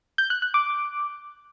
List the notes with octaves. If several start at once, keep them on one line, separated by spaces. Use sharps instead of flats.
G6
F#6
F#6
D6